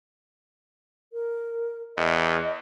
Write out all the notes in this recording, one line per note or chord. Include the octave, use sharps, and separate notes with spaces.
A#4
E2 D#5